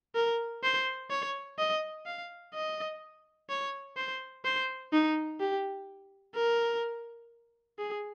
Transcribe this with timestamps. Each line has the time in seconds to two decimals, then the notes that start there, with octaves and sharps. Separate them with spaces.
0.15 A#4
0.64 C5
1.10 C#5
1.58 D#5
2.06 F5
2.54 D#5
3.49 C#5
3.97 C5
4.45 C5
4.92 D#4
5.40 G4
6.35 A#4
7.79 G#4